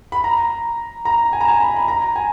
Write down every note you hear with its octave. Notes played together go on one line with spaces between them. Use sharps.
B5
A#5
A#5
G#5
A#5
G#5
B5
B5
A#5
G#5